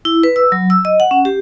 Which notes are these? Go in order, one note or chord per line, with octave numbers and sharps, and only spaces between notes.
E4
B4
E6
F#3
E6
D#5
F#5
C#4
G4